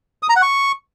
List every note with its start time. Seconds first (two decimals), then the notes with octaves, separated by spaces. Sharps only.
0.23 D#6
0.29 A#5
0.36 F#5
0.42 C#6